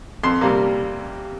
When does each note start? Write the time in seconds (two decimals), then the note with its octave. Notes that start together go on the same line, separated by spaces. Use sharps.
0.23 F2 C6
0.41 C3 G3 A#3